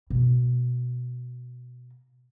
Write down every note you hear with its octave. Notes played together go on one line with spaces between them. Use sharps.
B2 A#3